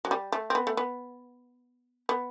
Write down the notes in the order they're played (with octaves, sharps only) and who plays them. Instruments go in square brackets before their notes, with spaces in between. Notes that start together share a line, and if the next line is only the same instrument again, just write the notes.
[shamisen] F#3
G3
A3
C4
B3
A3
B3
B3